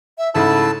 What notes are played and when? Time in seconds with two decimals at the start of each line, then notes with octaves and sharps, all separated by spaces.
0.18 E5
0.35 G#2 C#3 A3 E4 A5 E6